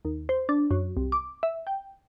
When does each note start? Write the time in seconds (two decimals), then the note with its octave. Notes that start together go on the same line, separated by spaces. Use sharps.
0.05 D#2
0.29 C5
0.49 D4
0.71 F#2
0.97 C2
1.12 D6
1.43 E5
1.67 G5